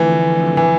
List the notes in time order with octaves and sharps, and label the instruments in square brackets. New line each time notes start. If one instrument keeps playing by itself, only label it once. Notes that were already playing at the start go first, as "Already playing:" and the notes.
Already playing: [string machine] F2 D3 F3 A3 [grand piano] E3
[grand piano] E3